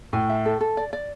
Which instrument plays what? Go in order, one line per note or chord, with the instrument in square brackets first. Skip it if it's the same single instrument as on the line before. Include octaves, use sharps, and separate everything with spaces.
[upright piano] A2 [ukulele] G#5
[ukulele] E5
A4
A4
D5
D5